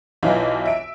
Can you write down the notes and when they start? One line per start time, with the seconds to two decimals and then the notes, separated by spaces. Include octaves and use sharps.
0.23 B1 E3 D#4 F4
0.65 E5 D7